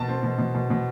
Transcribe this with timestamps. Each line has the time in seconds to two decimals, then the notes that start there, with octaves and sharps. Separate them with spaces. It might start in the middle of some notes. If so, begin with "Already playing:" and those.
Already playing: B2 A5
0.08 C4
0.23 B2
0.38 B2
0.54 B2
0.70 B2